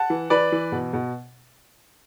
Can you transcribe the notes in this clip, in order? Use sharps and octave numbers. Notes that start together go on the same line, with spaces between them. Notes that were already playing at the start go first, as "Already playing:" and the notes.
Already playing: F#5 A5
E3
E3 B4 D5
E3
B2
B2